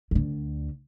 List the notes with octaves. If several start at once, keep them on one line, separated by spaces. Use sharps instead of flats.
D2 D3